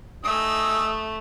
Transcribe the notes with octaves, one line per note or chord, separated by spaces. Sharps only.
A3 D#4 G#5 D#6 E6